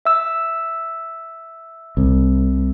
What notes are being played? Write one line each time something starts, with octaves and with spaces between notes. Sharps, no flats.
E5 E6
C2